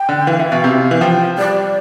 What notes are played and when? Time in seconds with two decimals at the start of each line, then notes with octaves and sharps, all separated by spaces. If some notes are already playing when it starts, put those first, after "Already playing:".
Already playing: G5
0.09 D3
0.27 E3 F5
0.39 E3 E5
0.52 B2 F5
0.64 C3
0.91 E3
1.01 F3 G5
1.38 G3 D5